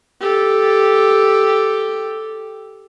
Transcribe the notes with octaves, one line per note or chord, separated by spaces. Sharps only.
G4 A4